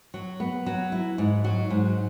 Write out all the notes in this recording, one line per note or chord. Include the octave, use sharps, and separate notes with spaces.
F#3
B3
F#3
E4
G#2
F#3
G#2